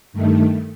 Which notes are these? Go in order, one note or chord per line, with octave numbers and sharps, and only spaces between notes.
G2 D#3 A3